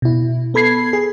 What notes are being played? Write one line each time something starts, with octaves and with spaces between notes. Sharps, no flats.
B2 E4
B3 A4 B5 G#6 C7
G#4